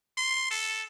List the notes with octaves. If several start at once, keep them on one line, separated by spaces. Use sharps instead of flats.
C6
A4